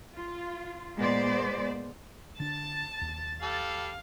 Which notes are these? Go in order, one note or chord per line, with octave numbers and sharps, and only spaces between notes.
F4
A#2 G#3 B3 C5 D5
D3 D4 A5 A6
D#2
G3 A4 F5